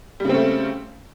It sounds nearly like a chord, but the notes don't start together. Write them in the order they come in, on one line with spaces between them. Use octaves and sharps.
G3 C#3 C4 A3